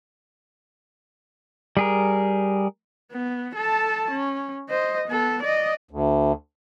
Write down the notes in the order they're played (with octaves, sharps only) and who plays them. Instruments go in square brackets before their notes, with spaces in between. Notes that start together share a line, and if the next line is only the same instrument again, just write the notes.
[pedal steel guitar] G3 G#4 A#4
[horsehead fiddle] B3
A4 A5
C#4
C5 D#5
B3 A4
D5 D#5
[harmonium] D2